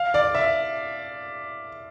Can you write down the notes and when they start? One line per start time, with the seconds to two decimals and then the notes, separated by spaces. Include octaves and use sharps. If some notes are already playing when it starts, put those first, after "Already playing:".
Already playing: F5
0.14 D5
0.35 E5